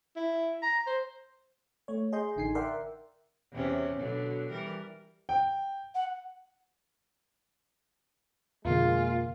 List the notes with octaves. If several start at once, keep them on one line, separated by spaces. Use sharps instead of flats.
E4
A#5
C5
A3 C#5
G#4 D#5 C6 G6
A1 D3 D#4 G#5 C7
A#4 D5 E5 F#5 G5 C6
E2 C3 C#4
B2 D3 F#3
E3 G3 A#4
G5
F#5
F2 B2 D3 G#3 A#3 F4